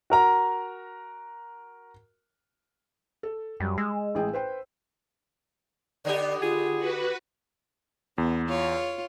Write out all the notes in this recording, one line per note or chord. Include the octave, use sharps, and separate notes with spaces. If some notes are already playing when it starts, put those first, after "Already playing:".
F#4 A#4 A#5
A4
F#2 G3
G#3 E6
A1 G#4 G5
B4 C5 G5
D3 B3 G4 D5
F4 G#4
F#4 B4
E2 B3
F4 C#5